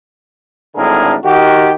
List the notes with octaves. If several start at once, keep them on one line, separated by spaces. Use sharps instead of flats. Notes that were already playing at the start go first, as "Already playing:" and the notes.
G#1 A2 D3 D4 G#4 A#4
D#3 F#4 G4